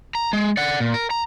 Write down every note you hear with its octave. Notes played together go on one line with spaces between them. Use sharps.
A#5
G#3
D5 F#5
A#2
A#4
A#5